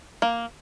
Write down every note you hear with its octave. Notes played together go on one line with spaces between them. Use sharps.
A#3